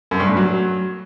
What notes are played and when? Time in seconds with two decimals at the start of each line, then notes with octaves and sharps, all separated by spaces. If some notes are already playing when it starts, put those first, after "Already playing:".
0.11 F#2
0.20 G2
0.28 A2
0.37 F#3